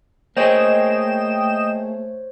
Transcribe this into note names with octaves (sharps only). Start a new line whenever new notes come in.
A3 A#3 G#4 C5 C#5 D#5 G5 E7